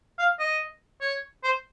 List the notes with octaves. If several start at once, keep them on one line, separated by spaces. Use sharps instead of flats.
F5
D#5
C#5
C5